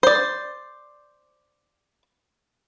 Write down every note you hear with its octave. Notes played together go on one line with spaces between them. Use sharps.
C5 D5